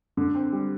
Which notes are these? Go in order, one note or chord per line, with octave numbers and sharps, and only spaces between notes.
D3
C4
G3